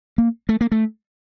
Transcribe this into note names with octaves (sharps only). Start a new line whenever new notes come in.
A#3
A3
A#3
A3